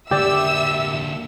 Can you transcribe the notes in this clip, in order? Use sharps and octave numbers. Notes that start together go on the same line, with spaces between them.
D3 A#3 G4 D5 E5 E6